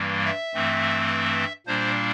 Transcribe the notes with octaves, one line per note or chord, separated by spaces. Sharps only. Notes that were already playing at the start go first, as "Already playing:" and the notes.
Already playing: G2 E3 G3 A#3
E5
G2 E3 A3 C4
A#2 G3 A#3 D4 C5